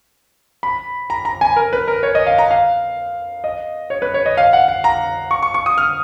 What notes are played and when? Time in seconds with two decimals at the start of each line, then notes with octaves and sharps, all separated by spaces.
0.63 B5
1.10 A#5
1.25 A#5
1.41 G#5
1.56 A#4
1.73 B4
1.88 A#4
2.03 C#5
2.15 D#5
2.27 F5
2.38 A#5
2.51 F5
3.44 D#5
3.90 C#5
4.02 B4
4.14 C#5
4.26 D#5
4.37 F5
4.53 F#5
4.68 F#5
4.84 A#5
5.31 C#6
5.43 C#6
5.54 C#6
5.66 D#6
5.78 F6